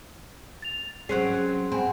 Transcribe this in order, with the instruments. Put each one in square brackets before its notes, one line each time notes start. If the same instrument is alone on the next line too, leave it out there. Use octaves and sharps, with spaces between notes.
[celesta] A6 F7
[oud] F#3 C4 C#4 [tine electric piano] G#4 [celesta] F#6 C7
[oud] C4 [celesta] F#5 G#5 B5